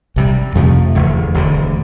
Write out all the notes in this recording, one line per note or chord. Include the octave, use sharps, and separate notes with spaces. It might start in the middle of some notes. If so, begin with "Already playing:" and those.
C2 C3 G3
F2 C3 F3 A3
F1 E2 D3
E1 D2 D3